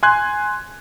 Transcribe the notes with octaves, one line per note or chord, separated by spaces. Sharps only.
G#5 C6 F#6 G#6